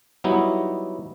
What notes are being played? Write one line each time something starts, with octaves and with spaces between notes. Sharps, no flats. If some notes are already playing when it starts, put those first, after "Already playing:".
F#3 G3 B3 D#4 E4